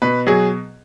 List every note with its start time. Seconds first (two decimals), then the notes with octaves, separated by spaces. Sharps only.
0.02 B2 B4
0.27 F#3 G#4